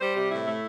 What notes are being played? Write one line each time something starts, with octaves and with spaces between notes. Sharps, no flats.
G3 C5
C3 G4
A2 E4
A3